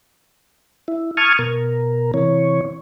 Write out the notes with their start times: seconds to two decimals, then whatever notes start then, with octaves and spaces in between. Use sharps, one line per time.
0.88 E4
1.17 A5 C#6 D#6 F6 G#6
1.39 B2 A#4
2.14 C3 E3 C#5